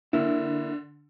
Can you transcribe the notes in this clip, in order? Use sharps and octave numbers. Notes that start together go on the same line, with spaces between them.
D3 A#3 E4